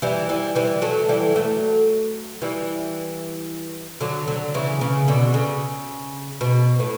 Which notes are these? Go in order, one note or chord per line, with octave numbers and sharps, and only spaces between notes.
E3 G3
E3 G3
E3 G3
F#3 A3
E3 G3
F#3 A3
E3 G3
D3 F#3
D3 F#3
C#3 E3
C#3
B2 D3
C#3
B2
A2